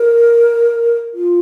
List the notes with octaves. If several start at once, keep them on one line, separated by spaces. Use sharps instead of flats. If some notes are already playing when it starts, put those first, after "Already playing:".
Already playing: A#4
F4